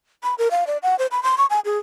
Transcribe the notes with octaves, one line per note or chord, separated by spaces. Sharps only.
B5
A#4
F5
D5
F#5
C5
B5
C6
C#6
G#5
G#4